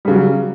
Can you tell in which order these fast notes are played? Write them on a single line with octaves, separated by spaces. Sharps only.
G3 C#3 F#3